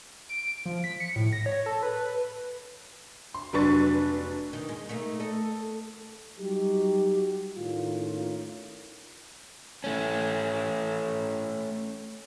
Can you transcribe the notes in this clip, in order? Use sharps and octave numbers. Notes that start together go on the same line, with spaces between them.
D7
F3
B6
C#7
A2
A#6
C#5
A4
B4
C6
F1 F#3 D4 B4 C#6 A6
D#3
G#3
A3 A#3 D#4
A4 D#5
F#3 G3 D#4 F#4 G4
A2 D#3 A3 A#3 C#4 F4
A3 C#4